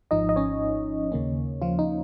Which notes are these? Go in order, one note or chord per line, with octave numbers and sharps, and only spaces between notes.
G#1 G#2 F3 D#4 D#5
D#5
C#4 C#5
D#2 C#3 A#3 C#4
F3 F4
D#4